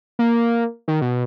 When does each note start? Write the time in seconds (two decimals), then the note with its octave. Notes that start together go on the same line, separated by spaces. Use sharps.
0.19 A#3
0.88 D#3
1.02 B2